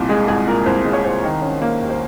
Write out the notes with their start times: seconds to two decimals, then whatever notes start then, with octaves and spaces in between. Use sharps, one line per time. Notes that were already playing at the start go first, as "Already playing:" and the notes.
Already playing: C2 A#2
0.09 G#3 G#4
0.28 C2 G#4
0.47 A#2 A#4
0.66 C2 C5
0.85 G#3
0.93 C#5
1.04 C2 C5
1.24 D#3
1.42 C#4
1.62 A#3
1.81 D#2
1.90 C5